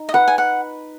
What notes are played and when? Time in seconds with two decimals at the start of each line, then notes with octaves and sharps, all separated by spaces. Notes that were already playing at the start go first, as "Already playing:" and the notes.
Already playing: D#4
0.09 D#5
0.14 B4 F#5
0.28 G#5
0.38 F#5